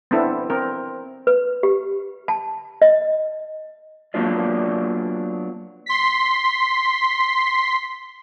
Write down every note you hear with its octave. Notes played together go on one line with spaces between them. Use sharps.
B3 C4 D4 E4 A4
C4 A#4
B4
G4
A5
D#5
F#3 A#3 B3 D4 F4 D5
C6 B6